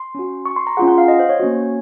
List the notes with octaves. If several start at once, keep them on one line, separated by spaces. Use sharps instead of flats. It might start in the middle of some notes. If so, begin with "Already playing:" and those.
Already playing: C6
C#4 F#4
C#6
C6
A#5
C#4 F4 G#4 F#5
F#5
F5
D#5
C5
C#5
A#3 C#4 F#4